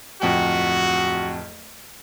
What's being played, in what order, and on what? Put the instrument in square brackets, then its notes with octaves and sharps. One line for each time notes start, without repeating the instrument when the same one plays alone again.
[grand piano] D1 F2 G5 [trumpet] F#4